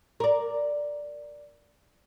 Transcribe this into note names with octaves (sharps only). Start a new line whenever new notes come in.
A#4 D5